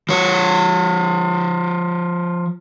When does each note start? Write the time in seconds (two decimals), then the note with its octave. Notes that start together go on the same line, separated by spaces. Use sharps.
0.09 F3 C#5